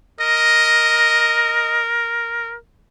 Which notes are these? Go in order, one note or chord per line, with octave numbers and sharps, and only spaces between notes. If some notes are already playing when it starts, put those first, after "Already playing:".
A#4 D#5